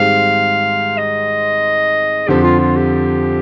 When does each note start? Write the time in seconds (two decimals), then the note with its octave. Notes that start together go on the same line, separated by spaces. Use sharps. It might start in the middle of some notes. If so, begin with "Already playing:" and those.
Already playing: G#2 D#3 G3 C4 F5
0.97 D#5
2.28 F2 D3 F3 G4
2.44 F4
2.60 F4
2.76 G4